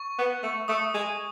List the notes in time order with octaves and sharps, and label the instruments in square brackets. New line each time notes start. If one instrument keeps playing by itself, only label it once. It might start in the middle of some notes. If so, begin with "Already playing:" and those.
Already playing: [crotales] C#6
[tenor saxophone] B3
A3
[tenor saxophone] A3 [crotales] D#6
[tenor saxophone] G#3